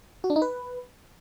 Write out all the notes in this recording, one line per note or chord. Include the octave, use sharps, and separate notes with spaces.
F#4
D4
D#4
B4